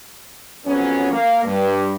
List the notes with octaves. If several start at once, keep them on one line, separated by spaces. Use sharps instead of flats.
F2 G#2 F#3 B3 C#4
A#3 F5
G2